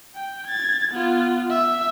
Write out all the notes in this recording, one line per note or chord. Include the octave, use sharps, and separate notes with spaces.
G5
G#6 A6
B3 F4
E5